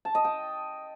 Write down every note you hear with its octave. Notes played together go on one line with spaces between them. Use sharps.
A5
D#5
G5